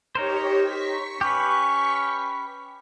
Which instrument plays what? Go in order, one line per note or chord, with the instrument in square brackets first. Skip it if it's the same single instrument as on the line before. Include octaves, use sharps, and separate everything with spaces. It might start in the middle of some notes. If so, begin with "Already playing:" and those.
[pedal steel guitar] D#4 A#4 C5 [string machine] G4 C#5
[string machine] C#6 B6
[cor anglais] C#4 [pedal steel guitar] G4 B4